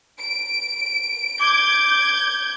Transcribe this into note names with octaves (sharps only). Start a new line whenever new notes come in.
D7
D6 G6 G#6